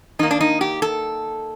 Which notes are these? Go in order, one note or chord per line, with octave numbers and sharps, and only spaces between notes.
D#3 A#3 D#4
D4
D#4
G4
A4